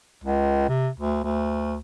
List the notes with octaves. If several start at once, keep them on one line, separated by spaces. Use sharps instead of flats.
C#2
C3
D2
D2